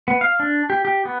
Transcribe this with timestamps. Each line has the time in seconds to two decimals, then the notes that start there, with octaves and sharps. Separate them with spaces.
0.08 B3
0.21 F5
0.40 D4
0.70 G4
0.85 G4
1.05 B3